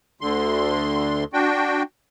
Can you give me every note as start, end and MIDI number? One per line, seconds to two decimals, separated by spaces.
0.21 1.24 38
0.21 1.24 50
0.21 1.24 84
1.33 1.83 62
1.33 1.83 66
1.33 1.83 79